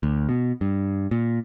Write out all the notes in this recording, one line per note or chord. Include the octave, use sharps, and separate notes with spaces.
D2
B2
G2
A#2